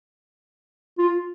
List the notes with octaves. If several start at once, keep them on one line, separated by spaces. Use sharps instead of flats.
F4